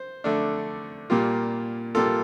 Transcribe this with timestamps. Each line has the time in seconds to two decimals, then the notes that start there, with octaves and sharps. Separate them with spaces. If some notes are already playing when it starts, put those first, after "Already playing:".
Already playing: C5
0.24 D3 A3 D4
1.10 A#2 G3 A#3 F4
1.95 A#2 G3 A#3 F4 A4